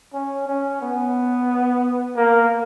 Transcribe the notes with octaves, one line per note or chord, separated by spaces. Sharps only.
C#4
C#4
B3
A#3